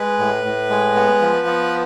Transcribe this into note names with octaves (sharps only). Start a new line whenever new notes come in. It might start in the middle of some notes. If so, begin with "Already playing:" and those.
Already playing: G#3 B4
A2
A2
G#3
B3
F3
B3